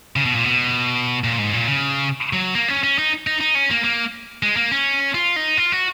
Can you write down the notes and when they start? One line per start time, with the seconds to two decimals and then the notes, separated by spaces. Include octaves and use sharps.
0.16 C#3
0.25 B2
0.35 A#2
0.44 B2
1.24 A#2
1.38 G#2
1.53 A#2
1.67 C#3
2.33 F#3
2.55 A#3
2.68 C#4
2.84 C#4
2.98 D#4
3.27 D#4
3.41 D#4
3.55 C#4
3.70 A#3
3.84 A#3
4.43 G#3
4.56 A#3
4.71 C#4
5.14 F4
5.36 D#4
5.57 F4
5.72 F#4